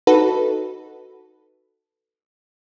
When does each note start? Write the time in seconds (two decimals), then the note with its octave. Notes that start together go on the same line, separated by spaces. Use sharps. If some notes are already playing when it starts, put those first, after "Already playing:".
0.07 D#4 F#4 A4 B4